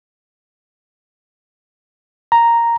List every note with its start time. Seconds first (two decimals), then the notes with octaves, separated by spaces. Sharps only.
2.32 A#5